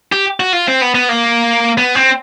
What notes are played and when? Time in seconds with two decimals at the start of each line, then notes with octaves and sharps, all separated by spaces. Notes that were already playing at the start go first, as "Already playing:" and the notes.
0.12 G4
0.40 F#4
0.53 F4
0.68 C4
0.81 B3
0.95 B3
1.09 A#3
1.78 B3
1.95 C4